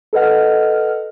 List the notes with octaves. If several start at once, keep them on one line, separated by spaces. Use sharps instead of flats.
A4 B4 D#5 F#5 F6